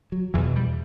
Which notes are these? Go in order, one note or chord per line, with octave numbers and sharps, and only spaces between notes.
F#3
E2 B2 E3
G3